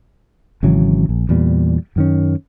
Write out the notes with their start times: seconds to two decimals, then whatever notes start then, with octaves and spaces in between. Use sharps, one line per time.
0.63 G#1 C#3 E3 F#3
1.09 A#1
1.29 E2 A#2 G3
1.96 F#2 D#3 C#4